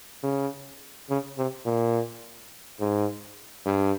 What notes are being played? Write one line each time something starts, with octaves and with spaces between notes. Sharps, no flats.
C#3
C#3
C3
A#2
G#2
G2